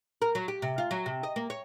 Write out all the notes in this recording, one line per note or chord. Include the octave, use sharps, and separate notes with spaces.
A#4
F#3
G4
C3
F4
F#3
C3
D#5
A#3
C#5